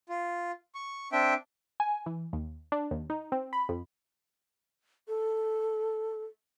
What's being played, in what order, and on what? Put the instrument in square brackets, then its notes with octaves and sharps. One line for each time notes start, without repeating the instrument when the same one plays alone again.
[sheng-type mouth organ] F4
C#6
C4 D4 E5 G5
[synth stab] G#5
E3
D#2
D4
D#2
D#4
C4
B5
F2
[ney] A4